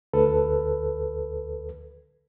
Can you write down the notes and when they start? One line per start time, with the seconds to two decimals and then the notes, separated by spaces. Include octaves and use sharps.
0.13 D2 A4 B4